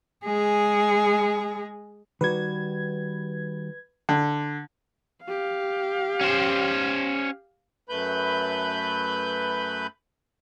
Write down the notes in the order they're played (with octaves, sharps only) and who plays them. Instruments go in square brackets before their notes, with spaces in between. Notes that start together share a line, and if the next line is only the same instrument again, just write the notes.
[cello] G#3 G#4
[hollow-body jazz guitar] D#3 G3 F#4 [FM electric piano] B4 G#6
[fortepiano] D3
[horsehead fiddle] G4 F5
[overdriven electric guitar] C#4 C5
[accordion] F#2 A3 B4 B5 G6